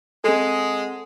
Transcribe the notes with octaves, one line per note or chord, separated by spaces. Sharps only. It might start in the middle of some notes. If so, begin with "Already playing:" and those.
G#3 C4 A4